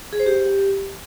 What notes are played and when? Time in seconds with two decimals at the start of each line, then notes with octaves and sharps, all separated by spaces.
0.13 G#4
0.20 C5
0.26 G4